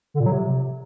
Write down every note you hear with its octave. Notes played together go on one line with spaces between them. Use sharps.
D3
A#2
F#3
C3